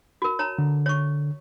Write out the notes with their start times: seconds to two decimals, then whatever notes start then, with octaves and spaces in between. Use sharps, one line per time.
0.22 F#4 A#4
0.39 C#5 A5 A#5
0.59 D3
0.86 C#5 C#6